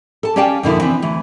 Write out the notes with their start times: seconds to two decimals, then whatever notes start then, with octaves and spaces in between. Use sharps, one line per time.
0.23 A4 A5
0.36 C#4 G4 D5 F5 G5 A5
0.63 F2 B2 D3 A#3 E4
0.80 E3 B3 C4 D4
1.02 D2 E3